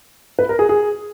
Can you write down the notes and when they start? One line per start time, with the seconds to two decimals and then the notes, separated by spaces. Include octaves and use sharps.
0.39 B4
0.49 A#4
0.59 G#4
0.69 G#4